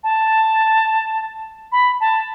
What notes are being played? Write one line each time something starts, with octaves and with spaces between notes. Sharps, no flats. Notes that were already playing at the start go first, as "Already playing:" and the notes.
A5
B5
A5